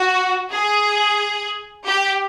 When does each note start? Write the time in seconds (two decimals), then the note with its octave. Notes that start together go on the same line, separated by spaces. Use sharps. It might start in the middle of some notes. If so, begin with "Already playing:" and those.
Already playing: F#4
0.52 G#4
1.86 G4